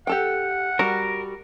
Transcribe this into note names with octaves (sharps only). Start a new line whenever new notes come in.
G4 A4 F#5 G5
G3 F#4 A#4